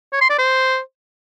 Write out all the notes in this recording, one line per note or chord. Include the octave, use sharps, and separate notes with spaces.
C#5
C6
D5
C5